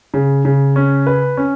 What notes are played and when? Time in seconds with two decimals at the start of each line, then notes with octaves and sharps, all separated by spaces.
0.14 C#3
0.45 C#3
0.76 C#4
1.07 B4
1.37 C#4